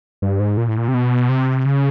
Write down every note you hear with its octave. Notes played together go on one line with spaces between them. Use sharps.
G2
G#2
A#2
A2
A#2
C3
B2
C3
C#3